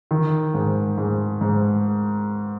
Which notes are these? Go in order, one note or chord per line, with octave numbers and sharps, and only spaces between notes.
D#3
G#2
G#2
G#2